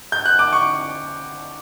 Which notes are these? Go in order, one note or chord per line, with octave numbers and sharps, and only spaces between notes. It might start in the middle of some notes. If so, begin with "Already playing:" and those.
G6
F#6
D6
C#6